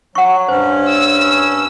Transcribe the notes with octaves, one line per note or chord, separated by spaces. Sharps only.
F#3 F#5 C#6
G2 C#4 C5
E6